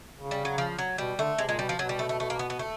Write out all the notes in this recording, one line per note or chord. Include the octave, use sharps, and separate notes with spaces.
C#3
G3
F#3
F3
F#3
B2 G3
D3 A3
C3 G#3
A#2 G#3
B2 G3
F3
B2 F#3
G3
A3
A3
A3
A#3
B3
B3
A3